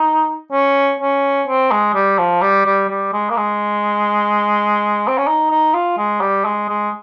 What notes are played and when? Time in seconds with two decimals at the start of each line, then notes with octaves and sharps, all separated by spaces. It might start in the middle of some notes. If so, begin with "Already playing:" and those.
Already playing: D#4
0.52 C#4
1.00 C#4
1.48 C4
1.71 G#3
1.94 G3
2.19 F3
2.42 G3
2.65 G3
2.89 G3
3.13 G#3
3.30 A#3
3.37 G#3
5.07 C4
5.18 C#4
5.27 D#4
5.50 D#4
5.74 F4
5.98 G#3
6.21 G3
6.45 G#3
6.69 G#3